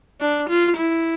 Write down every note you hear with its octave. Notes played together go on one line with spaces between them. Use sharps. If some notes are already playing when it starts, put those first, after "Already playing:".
D4
F4
E4